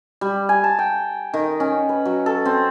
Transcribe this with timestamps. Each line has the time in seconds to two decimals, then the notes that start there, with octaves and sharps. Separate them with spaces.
0.21 G3
0.49 G#5
0.64 A5
0.79 G5
1.34 D#3
1.60 C#4
1.89 B4
2.05 F#3
2.26 A4
2.45 C4